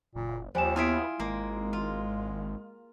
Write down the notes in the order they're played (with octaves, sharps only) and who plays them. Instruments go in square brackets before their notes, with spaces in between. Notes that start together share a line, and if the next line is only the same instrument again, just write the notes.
[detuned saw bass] F#1 [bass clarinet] A#2
[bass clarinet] D#2 [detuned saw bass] F3 [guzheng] G3 [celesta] C5 G#5 E7
[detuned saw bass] B3 [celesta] E4 D7 [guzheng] F4 G#4 E5
[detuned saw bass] G#1 [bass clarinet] G#3 [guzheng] A#3
[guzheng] F4